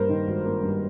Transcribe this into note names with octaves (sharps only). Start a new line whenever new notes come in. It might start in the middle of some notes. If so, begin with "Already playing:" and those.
Already playing: G2 A#3 A#4 C5
D#3
G#1
A#3
G2